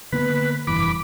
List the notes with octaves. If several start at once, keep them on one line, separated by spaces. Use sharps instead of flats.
D3 A#3 B3 B4
F1 G2 E3 B5 D6